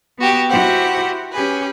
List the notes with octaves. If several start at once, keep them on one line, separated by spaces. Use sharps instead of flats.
B3 F#4 G4
E4 F#4 G4 C5 E5 F#5
C#4 G4 G#4 B4